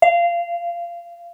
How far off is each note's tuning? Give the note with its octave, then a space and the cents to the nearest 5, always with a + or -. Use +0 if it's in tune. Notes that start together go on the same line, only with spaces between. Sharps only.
F5 -20